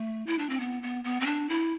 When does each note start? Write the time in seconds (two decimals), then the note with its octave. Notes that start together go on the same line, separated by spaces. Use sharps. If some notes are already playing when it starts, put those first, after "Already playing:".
Already playing: A3
0.27 E4
0.39 D4
0.50 C4
0.60 B3
0.83 B3
1.04 B3
1.20 C4
1.26 D4
1.49 E4